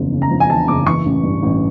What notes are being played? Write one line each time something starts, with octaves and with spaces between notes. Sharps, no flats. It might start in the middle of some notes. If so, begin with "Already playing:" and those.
Already playing: F#1 E2 C#3 F3
C#3
A#5
F3
G#5
E2 A5
F#1 D6
E3 C#6
A1
G2
A1